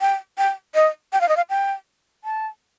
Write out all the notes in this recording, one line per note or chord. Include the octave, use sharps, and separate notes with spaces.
G5
G5
D#5
G5
F5
D#5
F5
G5
A5